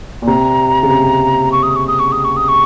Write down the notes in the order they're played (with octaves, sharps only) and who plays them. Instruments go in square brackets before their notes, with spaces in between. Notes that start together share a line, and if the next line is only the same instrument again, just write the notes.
[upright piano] A#2
[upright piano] C3 [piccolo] A#5
[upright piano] C#3
C3
[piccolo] C#6
D#6
C#6
D#6
C#6
D#6
C#6
D#6
C#6